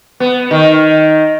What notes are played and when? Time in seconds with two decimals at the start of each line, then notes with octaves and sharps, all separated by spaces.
0.20 B3
0.51 D#3